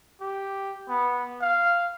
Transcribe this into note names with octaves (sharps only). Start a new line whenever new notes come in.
G4
B3
F5